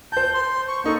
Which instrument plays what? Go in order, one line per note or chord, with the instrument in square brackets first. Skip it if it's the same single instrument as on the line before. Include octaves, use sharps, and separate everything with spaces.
[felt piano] C5 A5 [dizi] G6
[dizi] C6
C#6
[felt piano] A#3 D#4 A4 [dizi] C#6